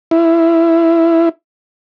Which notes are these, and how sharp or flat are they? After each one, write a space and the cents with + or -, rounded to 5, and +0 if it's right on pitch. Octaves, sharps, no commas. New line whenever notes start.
E4 +10